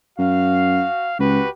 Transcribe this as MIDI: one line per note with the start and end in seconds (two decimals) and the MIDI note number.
0.19 0.83 42
0.19 1.14 66
0.19 1.14 77
1.19 1.40 37
1.19 1.49 66
1.19 1.49 67
1.19 1.49 71